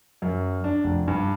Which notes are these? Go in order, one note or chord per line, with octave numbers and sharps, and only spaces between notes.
F#2
D4
F1
G2